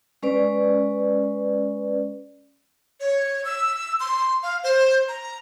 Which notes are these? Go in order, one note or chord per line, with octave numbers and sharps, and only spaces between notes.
G#3 C#4 B4 D5
C#5
E6
C6
F5
C5
A#5